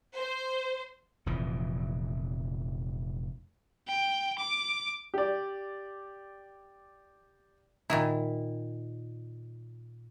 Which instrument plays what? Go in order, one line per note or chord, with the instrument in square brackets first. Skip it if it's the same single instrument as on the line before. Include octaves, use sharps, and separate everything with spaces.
[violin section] C5
[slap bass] F1 F2 A#2 E3
[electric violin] G5
D6
[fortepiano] G4 D5
[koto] A#2 D#3 E4